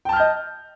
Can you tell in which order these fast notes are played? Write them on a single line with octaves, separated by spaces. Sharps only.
G5 A5 F6 G6 D#5